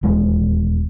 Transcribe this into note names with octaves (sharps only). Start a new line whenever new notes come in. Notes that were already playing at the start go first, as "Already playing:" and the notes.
D#1 E2 G#3